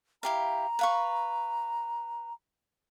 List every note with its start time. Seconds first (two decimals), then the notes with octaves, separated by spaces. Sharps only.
0.23 E4 G4 F5 A#5
0.79 B4 F5 C#6